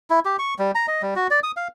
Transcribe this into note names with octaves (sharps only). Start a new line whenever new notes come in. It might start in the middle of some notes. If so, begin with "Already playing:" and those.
E4
G4
C#6
G3
A#5
D#5
G3
F#4
D5
D#6
F5